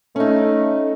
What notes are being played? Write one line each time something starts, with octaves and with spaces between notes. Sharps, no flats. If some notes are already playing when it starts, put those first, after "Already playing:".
A3 C#4 D#4